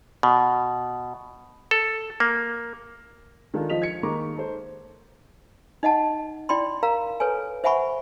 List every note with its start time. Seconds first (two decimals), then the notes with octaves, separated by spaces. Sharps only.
0.23 B2
1.71 A4
2.20 A#3
3.54 D#3 G#3 D4 F4 A4
3.70 F3 F4 D#5 B6 F7
3.82 G#6 B6 C#7
4.03 D#3 G#3 A#3 A#5 C#6 D6
4.35 D#4 A4 C5
5.83 D#4 D#5 F#5 A5
6.49 E4 D5 G5 B5 C6
6.83 A#4 F5 A#5
7.20 A4 B4 C#5 G#5
7.64 C5 E5 F#5 G#5 B5 C#6